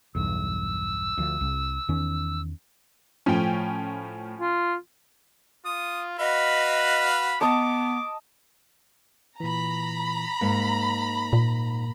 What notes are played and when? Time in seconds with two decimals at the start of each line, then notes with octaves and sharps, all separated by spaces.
0.15 B1 E2 G2 E6
1.18 D2 F3
1.41 C2
1.89 E2 D#3 C#4
3.26 A2 F3 C#4 G5
4.40 F4
5.66 F4 D#6
6.19 F#4 B4 D#5 F5 B5
7.41 B3 D#5 A5 D6 D#6
9.40 A#2 E3 A#5 B5
10.41 G#2 A#3
11.33 A#2